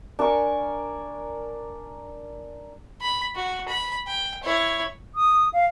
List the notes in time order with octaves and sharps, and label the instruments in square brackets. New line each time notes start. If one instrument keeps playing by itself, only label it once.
[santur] D4 A#4 G#5 C#6
[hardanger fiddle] B5
F#4
B5
G5
E4 C#5
[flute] D#6
F5